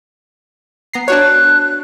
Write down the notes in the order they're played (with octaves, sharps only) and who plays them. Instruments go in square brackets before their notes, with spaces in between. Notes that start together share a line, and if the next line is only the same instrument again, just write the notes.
[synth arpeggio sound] B3 A#5 C7
[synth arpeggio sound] D4 F#4 C#5 [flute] F#6